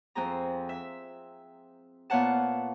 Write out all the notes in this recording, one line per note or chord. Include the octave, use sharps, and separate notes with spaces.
F2 C4 G#4 A#5
E5
A#2 B3 C#5 F5 F#5 A5